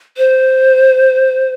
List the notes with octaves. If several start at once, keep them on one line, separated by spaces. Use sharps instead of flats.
C5